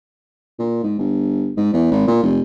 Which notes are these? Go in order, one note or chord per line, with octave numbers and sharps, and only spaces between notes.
A#2
G#2
G1
G#2
E2
G#1
A#2
F1